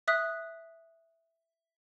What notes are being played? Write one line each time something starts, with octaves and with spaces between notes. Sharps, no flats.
E5 D#6 F#6 B6